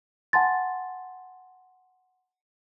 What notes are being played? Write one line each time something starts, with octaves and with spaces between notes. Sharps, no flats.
F#5 G#5 A5 C6 A6